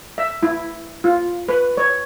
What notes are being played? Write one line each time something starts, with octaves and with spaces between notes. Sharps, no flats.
E5
E4
F4
B4
C#5